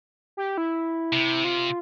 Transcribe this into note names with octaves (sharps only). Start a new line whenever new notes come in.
G4
E4
C3
F4